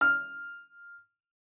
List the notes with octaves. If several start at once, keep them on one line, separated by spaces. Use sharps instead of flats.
F6